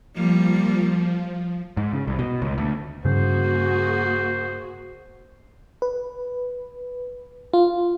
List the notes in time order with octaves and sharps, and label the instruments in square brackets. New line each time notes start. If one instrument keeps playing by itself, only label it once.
[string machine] F3 [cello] G3 A#3
[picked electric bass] G#2
C#3
C2
B2
C#2
D2
[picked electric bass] G2 C#3 [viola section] A#3 F#4 G#4 [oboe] C5
[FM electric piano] B4
F4